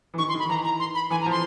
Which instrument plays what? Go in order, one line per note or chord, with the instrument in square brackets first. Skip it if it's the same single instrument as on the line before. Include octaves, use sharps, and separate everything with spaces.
[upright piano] E3
[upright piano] D#3 [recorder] C#6
[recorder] C6
[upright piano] D#3 [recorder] B5
[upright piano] E3 [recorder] A#5
[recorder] A#5
C6
B5
[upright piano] E3 [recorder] G#5
[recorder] A#5
[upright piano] F3 [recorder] C6